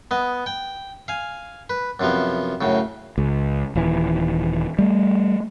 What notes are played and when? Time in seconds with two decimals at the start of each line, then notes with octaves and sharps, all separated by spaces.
0.11 B3 D#5
0.46 G5
1.08 F5 G#5
1.70 B4
2.00 F#2 C3 F3 B3
2.61 F#2 A2 C#3
3.18 C#2
3.75 D#1 E3
4.79 G3 A3